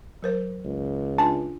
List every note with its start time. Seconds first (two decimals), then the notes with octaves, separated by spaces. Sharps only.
0.22 F#3 A#4 C5
0.65 C#2
1.18 D4 F4 G#5 A5